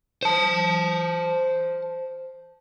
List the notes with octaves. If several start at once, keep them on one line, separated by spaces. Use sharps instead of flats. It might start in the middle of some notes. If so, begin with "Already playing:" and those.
C5 A5